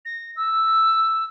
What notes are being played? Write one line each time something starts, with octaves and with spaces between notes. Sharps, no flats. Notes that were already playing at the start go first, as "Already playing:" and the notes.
A#6
E6